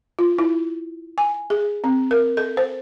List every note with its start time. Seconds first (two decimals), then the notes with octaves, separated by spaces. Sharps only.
0.19 F4
0.39 E4
1.18 G#5
1.50 G#4
1.84 C4
2.11 A#4
2.37 A4
2.57 C5